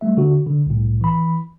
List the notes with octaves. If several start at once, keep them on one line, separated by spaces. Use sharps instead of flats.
G3 A3 E5
D3 F#4
D3
C2 A2
E3 B5